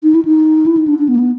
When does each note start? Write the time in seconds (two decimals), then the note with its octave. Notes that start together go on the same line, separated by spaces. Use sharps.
0.03 D#4
0.15 E4
0.25 D#4
0.66 E4
0.77 D#4
0.88 D4
0.98 D4
1.08 B3
1.15 A#3
1.19 B3